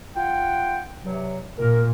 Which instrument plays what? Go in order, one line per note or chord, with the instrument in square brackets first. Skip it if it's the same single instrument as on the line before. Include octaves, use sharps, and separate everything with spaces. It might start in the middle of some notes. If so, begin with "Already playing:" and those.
[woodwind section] F4 F#5 G5
G2 C3 F#3
[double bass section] A#2 [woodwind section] A#4